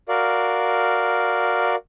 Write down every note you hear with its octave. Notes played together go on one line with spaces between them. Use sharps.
F#4 A#4 D5 F5